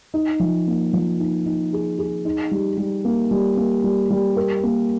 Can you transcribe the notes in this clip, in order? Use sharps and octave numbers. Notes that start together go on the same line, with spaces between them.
D#4
F3
A#3
F3
D#4
D#4
G#4
G#4
D#4
G3
G3
A#3
G3
A#3
G3
G3
A#4
A#3